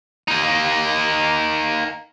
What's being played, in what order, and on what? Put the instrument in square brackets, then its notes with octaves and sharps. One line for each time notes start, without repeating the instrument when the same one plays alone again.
[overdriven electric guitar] A#3 D#4